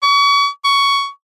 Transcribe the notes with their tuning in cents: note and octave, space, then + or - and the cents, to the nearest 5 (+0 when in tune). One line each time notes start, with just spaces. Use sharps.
C#6 +35
C#6 +15